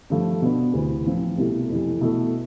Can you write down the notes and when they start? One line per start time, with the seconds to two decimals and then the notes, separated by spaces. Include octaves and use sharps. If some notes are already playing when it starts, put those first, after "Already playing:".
0.10 G2 F3 A3
0.42 B2 B3 D4
0.73 D2 C3 E3 B3
1.06 A2 F3 C4
1.38 C2 B2 A3 E4 A4
1.70 F2 C3 E3 A3
2.01 B2 A3 E4 A4